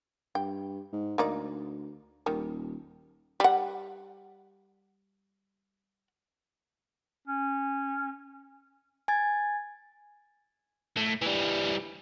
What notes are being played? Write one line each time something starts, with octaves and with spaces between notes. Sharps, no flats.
G2 G5
G#2
D2 A#3 D#4 D5
D#1 D#3 G3
G3 F#5
C#4
G#5 G#6 A6
A2
E3 G3